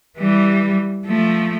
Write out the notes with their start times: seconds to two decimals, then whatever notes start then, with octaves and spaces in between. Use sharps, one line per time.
0.18 E3 G3
1.06 F3 A3